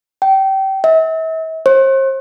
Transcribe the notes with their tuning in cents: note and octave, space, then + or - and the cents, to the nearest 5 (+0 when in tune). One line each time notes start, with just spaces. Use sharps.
G5 -25
E5 -40
C5 +40